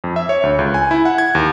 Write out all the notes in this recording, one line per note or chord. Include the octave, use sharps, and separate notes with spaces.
F2
E5
C#5
D2
C#2
G#5
E4
F#5
G#6
D#2